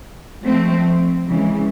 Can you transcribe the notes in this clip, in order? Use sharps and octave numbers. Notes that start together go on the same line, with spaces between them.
F3 A3 C4
C#3 E3 G#3